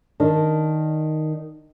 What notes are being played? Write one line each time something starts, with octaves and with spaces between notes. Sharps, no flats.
D#3 D4